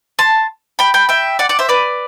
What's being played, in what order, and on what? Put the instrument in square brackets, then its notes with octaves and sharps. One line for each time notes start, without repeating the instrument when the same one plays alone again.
[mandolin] A5 C6
G5 B5
G5 B5
E5 G5
D5 F#5
D5 F#5
C5 E5
B4 D5